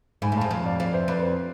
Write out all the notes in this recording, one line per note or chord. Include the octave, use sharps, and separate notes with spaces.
G#2 G#5 B5
A2
G#2 F5 A5
F2 F5 A5
D5 F5
F2 D5 F5
C5 E5
F2 B4 D5
C5